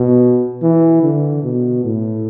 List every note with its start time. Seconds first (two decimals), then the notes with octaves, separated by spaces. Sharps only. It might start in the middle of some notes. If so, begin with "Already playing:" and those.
Already playing: B2
0.62 E3
1.03 D3
1.44 B2
1.84 A2